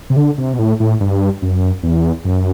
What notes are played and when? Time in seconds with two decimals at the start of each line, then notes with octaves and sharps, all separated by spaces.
0.10 C3
0.16 D3
0.38 C3
0.53 B2
0.59 A2
0.80 A2
1.00 G2
1.42 F#2
1.83 E2
2.25 F#2